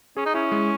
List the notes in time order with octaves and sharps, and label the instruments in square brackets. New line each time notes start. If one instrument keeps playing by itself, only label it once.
[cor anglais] C#4 [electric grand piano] G#4
[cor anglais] D#4
[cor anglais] C#4 [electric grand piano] E4
[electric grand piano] G#3